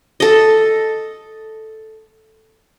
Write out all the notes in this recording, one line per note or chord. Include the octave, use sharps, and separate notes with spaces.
A4 D#5